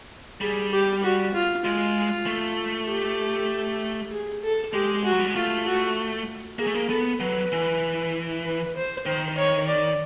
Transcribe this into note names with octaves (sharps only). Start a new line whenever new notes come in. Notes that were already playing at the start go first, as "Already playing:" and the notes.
G3 G#4
G4
F#4
F4
G#3 F4
A3
G4
G#4
A4
G#3 G4
F#4
F#3
G3
G#3
A3 F4
F#4
A#3 G#4
A3
A#3
B3 A4
F#3 B4
E3
B4
C5
D#3 C5
C#5
D5